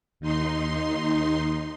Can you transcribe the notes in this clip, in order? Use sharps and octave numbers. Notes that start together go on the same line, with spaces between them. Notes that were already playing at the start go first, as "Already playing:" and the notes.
D#2 D#4 C6